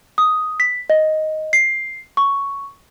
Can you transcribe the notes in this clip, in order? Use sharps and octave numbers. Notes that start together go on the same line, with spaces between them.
D#6
B6
D#5
C7
C#6